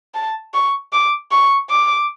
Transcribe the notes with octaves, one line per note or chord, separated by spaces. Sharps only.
A5
C#6
D6
C#6
D6